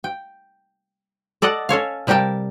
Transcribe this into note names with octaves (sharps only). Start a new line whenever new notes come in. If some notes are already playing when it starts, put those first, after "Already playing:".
G5
A4 D5 D#5 F#5 A5
C#4 A4 C#5 F5
C3 G3 G4 A#4 G5 A5